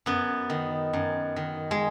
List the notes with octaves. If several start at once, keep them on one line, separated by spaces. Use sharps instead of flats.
F#2 B3
D#3
F#2
D#3
G#3